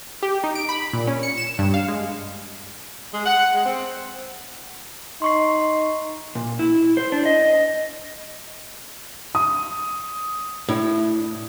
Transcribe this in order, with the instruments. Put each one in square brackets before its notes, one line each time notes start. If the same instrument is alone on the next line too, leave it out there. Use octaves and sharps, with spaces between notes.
[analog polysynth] G4
D#4
D7
B5
A#2
C#4
C#7
E7
G2
F5
G#3
[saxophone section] G#3
F#5
G#3
C4
[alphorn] D#4 [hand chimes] C6 C#6 C7
[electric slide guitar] A#2
E4
C5
D4
D#5
[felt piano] D#6
[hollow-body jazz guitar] A2 [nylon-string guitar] D4 E4